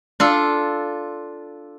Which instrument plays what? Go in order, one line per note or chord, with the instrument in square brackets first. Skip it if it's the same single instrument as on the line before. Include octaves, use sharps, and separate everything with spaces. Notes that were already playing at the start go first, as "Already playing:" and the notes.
[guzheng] D4 F4 A4